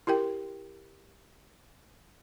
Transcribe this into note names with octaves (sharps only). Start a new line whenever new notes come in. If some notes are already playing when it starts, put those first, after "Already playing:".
E4 G4 A#4 G5